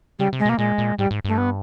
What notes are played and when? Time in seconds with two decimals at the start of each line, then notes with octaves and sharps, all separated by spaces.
0.19 C#3 G3
0.33 C3
0.39 G#3
0.45 B2 A#3
0.59 A#2 G#3
0.78 A#2
0.98 G#2 G3
1.11 G#2
1.25 G2 A3
1.38 B3